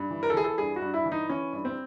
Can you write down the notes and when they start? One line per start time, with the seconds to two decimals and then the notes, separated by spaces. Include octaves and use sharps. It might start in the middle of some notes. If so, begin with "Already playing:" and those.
Already playing: G2
0.10 E3
0.23 A#4
0.30 A4
0.34 E3 G#4
0.44 A4
0.58 G2 G#4
0.76 F#4
0.82 G2
0.94 E4
1.06 E3
1.12 D#4
1.29 E3 C#4
1.53 G2
1.65 C4